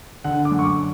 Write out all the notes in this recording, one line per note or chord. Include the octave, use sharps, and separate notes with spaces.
D3 F#5
D6
F#2
C#6
D6